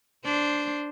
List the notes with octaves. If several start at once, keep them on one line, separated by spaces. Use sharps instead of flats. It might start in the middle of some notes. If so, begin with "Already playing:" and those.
D4 C5